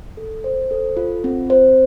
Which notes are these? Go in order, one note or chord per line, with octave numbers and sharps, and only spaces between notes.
A4
C5
A4
F4
C4
C5